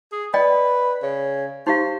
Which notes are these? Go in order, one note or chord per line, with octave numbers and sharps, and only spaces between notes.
G#4
B4 D5 D#5 G5
C#3
D#4 G4 C5 F5